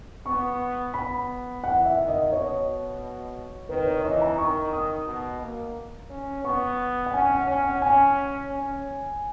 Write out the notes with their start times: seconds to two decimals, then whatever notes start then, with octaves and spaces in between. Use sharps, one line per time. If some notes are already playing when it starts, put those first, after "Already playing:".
0.26 B3 C#6
0.94 B3 B5
1.63 E3 F#5
1.86 E5
1.97 D#3
2.08 D#5
2.32 B2 C#5
3.69 D#3 B4
3.86 C#5
4.04 E3 D#5
4.22 A#5
4.38 D#3 C#6
4.73 D#6
5.07 B2
5.41 A#3
6.10 C#4
6.44 B3 C#6
7.06 F#5
7.13 C#4 G#5
7.30 F#5
7.47 C#4 G#5
7.64 F#5
7.82 C#4 G#5
8.51 C#4